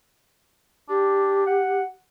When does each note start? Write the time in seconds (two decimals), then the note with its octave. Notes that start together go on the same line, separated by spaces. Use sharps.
0.89 D4 G4
1.46 F#5